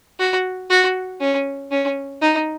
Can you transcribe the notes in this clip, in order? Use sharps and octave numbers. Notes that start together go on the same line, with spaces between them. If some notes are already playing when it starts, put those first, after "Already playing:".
F#4
F#4
C#4
C#4
D#4